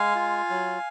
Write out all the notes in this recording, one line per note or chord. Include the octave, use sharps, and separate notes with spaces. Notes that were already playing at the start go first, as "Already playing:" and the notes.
Already playing: G#3 F5 G#5
F4
F#3